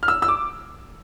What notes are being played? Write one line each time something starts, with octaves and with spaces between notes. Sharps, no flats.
F6
E6
E6
D6